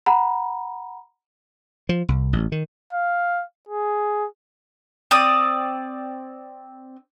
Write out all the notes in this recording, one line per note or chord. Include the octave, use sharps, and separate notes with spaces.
F#5 A#5 B5
F3
C2
A1
D#3
F5
G#4
C4 D5 D#6